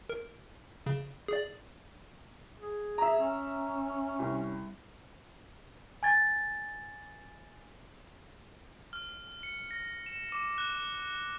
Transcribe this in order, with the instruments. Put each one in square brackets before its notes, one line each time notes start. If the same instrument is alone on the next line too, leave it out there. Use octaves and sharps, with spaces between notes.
[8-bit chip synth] A#4
C#3
G#4 D5
[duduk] G#4
[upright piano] E5 A#5
[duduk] C#4
[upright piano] C2
[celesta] G#5 G#6 A6
[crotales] F6
C#7
A#6
E7
D6
F#6